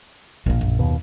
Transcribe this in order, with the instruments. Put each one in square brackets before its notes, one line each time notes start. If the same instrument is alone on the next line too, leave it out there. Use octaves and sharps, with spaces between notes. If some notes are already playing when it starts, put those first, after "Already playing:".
[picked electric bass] A#1 [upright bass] A#2 A#3
[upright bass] F#2
[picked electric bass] D#2 B2